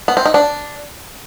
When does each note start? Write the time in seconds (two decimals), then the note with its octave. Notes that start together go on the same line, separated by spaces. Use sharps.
0.08 B3
0.17 C4
0.25 D#4
0.34 D4